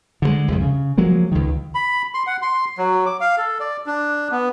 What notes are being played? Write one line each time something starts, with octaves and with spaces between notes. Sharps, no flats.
D3 F3 G#3
C2 F2
C#3
F3 F#3 G#3 A#3
C#2 D#3
B5
C6
F#5
C6
F#3
D6
F5
A4
D5
D4
B3